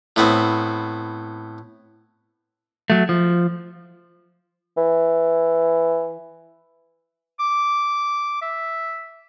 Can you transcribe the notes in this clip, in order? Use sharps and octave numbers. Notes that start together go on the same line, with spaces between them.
A2 B3 C4
F#3 A3
F3
E3
D6
E5